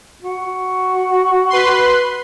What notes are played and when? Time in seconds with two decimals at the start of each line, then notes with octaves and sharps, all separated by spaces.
0.22 F#4
1.50 B4 C6